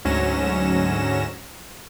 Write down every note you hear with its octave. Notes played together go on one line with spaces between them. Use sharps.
D2 G#2 F#3 C#4 A#6 E7